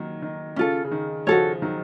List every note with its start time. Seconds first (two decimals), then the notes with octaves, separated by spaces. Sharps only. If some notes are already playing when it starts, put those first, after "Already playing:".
Already playing: D#3 F#3 A#3
0.22 D#3
0.56 C#3 C#4 F4 A4
0.84 C#3
0.91 D#3
1.27 C#3 F3 F#4 A4 C#5
1.62 D#3 F#3